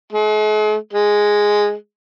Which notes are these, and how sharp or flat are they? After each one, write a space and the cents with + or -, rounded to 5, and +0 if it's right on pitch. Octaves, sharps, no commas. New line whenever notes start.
G#3 +45
G#3 -5